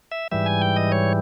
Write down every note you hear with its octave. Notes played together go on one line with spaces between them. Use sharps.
E5
G#2 E3 G3 E5
G#5
G5
D#5
C#5